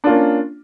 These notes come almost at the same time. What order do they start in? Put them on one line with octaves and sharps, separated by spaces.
D4 F4 A#3 C#4